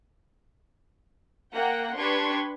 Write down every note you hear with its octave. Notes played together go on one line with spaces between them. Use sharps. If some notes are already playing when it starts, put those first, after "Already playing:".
A#3 F#5 G5
D4 G4 B4 C6 C#6 G#6